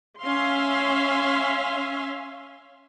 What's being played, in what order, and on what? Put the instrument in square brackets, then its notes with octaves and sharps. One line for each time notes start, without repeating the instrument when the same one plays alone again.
[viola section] C#4 E5 F5 C6